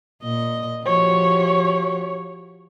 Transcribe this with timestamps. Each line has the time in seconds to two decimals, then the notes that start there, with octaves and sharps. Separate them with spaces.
0.23 A#2 D#5
0.85 F3 F#4 G4 C#5